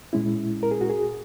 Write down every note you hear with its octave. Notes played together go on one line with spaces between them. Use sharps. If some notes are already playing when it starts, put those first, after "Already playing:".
A#2 G#3 C#4 E4
A#4
G#4
F#4
G#4